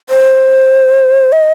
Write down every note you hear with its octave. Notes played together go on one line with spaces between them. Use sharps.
C5
D#5